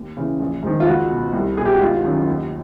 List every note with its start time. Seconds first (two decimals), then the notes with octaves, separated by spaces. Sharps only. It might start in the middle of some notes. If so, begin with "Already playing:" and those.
Already playing: D#2
0.17 C#3 E3
0.40 A#1
0.63 G#2 D#3
0.80 F4
0.87 C#2 F#4
1.11 B2
1.33 C2
1.57 B2 G#4
1.65 G4
1.73 F#4
1.81 G#1 F4
2.04 F#2 D#3
2.28 D#2